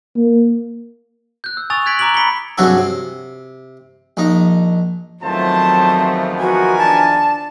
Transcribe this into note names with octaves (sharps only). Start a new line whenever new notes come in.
A#3
F#6 G6
E6
G#5 C#6 D#6 E6 A6 F7
F#6 G#6 B6 D7 F#7
A#5 D6 F#6 D7 F#7
B5 B6 C#7 G7
G2 C3 F#3 F#4 G#4 A4
C3
A#1 D#4
E2 D#3 F3 F#3 A3 C4 C5 A5
F#4 A#4 B4 G#5
D4 A5